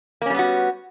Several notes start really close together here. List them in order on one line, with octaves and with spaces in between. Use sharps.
A#3 C#4 G3 B3 F#4